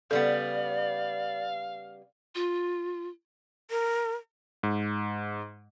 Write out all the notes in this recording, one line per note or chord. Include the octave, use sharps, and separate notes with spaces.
C#3 G3 B3 A4 D5 F5
F4
A#4
G#2